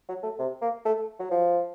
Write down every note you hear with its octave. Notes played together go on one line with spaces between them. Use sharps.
F#3
A3
C3
A#3
A3
F#3
F3